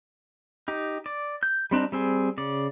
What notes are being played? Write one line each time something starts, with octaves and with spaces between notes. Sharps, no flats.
D#4 G4
D5
G6
G3 C4 D4 D#4
G3 C4 G#4
C#3 D5